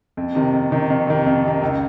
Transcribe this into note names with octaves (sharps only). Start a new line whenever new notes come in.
F2
C3 D#3
F2
C3 D#3
F2
C3 D#3
F2
C3 D#3
C#2